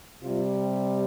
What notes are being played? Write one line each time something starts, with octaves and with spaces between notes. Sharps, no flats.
C3 G3 F4